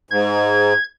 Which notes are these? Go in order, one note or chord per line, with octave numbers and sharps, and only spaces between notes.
G#2 G#6